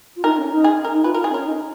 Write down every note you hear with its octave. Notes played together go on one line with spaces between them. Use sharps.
F4
D#4 A#4
C#4
D#4
G#4
A#4
D#4
F4 B4
A#4
F4
G#4
C#4
A#4
D#4